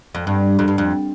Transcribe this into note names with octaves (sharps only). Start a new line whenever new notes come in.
F2
G2
F2
G2
F2